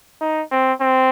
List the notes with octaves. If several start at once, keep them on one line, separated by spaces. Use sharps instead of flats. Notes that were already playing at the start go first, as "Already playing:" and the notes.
D#4
C4
C4